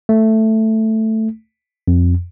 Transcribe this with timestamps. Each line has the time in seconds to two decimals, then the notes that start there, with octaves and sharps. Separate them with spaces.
0.09 A3
1.88 F2